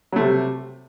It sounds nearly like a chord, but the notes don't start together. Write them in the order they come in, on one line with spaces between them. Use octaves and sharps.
F#3 A3 C3 G3